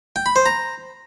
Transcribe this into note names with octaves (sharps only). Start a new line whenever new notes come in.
G5
B5
C5
A#5